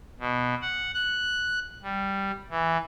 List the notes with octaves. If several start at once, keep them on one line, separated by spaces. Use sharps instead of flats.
B2
F#5
F#6
G3
E3